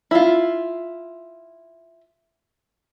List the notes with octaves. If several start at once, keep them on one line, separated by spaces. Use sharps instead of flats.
E4 F4